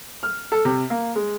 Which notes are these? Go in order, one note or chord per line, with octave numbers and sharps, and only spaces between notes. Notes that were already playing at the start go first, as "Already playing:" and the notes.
F6
A4
C3
A#3
G#3